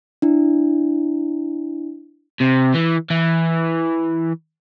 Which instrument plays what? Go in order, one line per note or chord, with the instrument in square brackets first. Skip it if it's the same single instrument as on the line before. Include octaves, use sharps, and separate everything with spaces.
[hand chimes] D4 E4
[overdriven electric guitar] C3
E3
E3